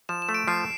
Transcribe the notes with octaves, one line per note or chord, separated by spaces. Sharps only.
F3 E7
E7
A3
D7
F3 C7